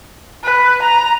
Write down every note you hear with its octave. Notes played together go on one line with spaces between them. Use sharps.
B4
A#5